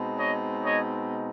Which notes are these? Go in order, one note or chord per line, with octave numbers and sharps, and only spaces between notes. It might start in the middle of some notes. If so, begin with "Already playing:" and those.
Already playing: B2 G#3 C4 D#4
C#5 D#5
C#5 D#5